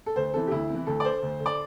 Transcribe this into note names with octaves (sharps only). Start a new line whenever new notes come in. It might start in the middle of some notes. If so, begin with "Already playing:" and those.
A4
D2 C5
C3 E3 A4
G4
D2 E4
C3 E3
D2 A4
D5
D3 C5
D2
D3
D5